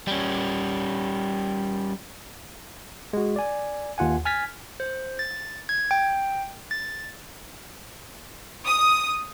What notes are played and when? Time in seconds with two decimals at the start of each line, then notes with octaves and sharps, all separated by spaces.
0.07 G3 C#4
3.13 G#3 F#4
3.36 D5 G#5
3.98 D#2 F4 F#5 G#5
4.26 G#5 F6 G#6 A6 B6
4.80 C5
5.19 A6
5.69 G#6
5.91 G5
6.71 A6
8.65 D#6